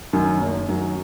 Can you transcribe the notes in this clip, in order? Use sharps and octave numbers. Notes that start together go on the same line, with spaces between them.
F#2 D#3 F#3
F#1
F#2 D#3 F#3